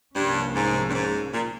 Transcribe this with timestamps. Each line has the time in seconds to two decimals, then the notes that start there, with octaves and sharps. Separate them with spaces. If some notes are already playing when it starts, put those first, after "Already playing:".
0.16 C2 G2 C3 F3 A#3 C#4
0.55 G#2
0.90 G2
0.94 G#2
1.34 A#2